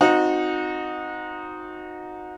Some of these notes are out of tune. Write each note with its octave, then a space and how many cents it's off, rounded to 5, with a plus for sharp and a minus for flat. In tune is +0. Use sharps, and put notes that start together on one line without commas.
C4 +0 D#4 +0 F#4 -25